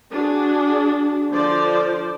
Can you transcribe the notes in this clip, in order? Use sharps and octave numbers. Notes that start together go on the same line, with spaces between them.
D4 F#4 G#4
D3 F3 C5 D5